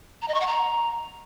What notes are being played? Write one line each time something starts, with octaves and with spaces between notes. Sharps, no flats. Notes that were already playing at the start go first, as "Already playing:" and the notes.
A#5
D#5
C#6
F#5
A#5